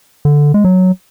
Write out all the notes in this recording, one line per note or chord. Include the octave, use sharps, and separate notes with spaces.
D3
G#3
F#3